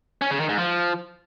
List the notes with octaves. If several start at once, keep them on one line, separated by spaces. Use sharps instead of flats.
C#4
C#3
D#3
G#2
F3